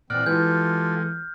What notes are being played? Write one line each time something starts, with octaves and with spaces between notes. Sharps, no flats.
A#2 E3 C4 D5 F#5 F6
E3 G#3 F4 G4 A4 G6